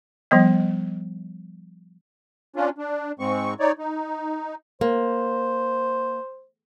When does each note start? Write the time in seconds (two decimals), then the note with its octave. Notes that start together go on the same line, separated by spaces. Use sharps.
0.31 F3 G3 B3 D#5
2.56 C#4 D4 F4
2.78 D4
3.19 G#2 G#3 C4 C#6
3.60 D#4 C#5 D5
3.79 D#4
4.81 A#3 C5